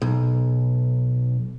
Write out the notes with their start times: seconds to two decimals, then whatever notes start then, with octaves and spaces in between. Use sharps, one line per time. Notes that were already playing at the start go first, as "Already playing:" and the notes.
0.02 B1